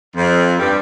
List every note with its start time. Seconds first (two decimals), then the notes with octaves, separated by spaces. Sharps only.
0.16 F2
0.59 G2 G3